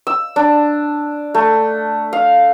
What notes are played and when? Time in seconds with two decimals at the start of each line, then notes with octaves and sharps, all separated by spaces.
0.07 E6
0.36 D4
1.34 A3
2.13 F5